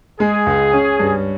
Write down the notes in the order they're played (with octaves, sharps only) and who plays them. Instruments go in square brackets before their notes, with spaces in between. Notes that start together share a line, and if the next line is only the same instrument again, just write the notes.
[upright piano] G#3 [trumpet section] G#4
[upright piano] C#2
C#4
G2